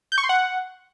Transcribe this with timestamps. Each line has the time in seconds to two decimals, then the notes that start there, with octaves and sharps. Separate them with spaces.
0.12 G6
0.18 C#6
0.23 C6
0.29 F#5